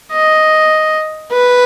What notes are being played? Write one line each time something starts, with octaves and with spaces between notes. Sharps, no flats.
D#5
B4